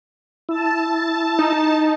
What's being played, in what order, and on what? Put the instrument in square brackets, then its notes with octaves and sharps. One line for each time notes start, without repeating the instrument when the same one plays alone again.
[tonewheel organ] E4 [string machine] A5
[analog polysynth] D#4